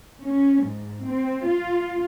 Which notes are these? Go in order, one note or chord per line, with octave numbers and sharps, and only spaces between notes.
C#4
G#2
C4
F4